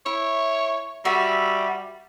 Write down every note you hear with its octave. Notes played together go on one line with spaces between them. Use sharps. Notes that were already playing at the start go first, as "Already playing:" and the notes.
E4 C#5
G3 F#4 E5